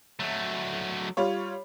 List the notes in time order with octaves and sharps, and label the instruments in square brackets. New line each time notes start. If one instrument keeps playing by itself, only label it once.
[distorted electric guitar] F#3 A3
[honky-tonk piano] G3 F4 C#5